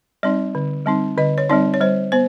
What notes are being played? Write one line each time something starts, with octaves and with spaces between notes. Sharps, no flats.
G3 C4 D#4 D5
D3
G3 C4 D#4
D3 D#5
C#5
G3 C4 D#4 D5
C#5
G3 C5
B3 C5